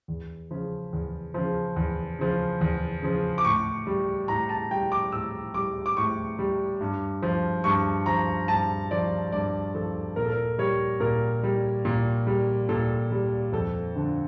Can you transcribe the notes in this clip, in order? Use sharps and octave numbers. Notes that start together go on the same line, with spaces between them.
E2
C#3 F3
E2
C#3 F3
E2
C#3 F3
E2
C#3 F3
D6
A2 C#6
G3
A2 A#5
A5
G3 G5
D6
A2 E6
G3 D6
D6
A2 C#6
G3
G2
F3
G2 C#6
F3 A#5
G2 A5
F3 D5
G2 D5
F3 A4
A#2 A#4
A4
A#4
G3 C#5
A#2 A#4
G3
A#2
G3
A#2 A4
G3
F2 A4
D3 F3